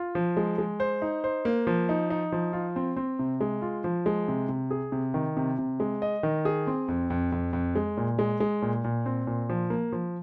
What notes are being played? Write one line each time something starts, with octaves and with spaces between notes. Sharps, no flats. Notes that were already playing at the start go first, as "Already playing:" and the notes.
Already playing: F4
F3
G#3
G#3
C5
D#4
C5
A#3
F3
D#4
D#4
F3
F4
C4
C4
C3
G#3
F4
F3
G#3
C3
C3
G#4
C3
D#3
C3
C3
G#3
D#5
D#3
G#4
C4
F2
F2
F2
F2
G#3
A#2
G#3
G#3
A#2
A#2
C4
A#2
F3
A#3
F3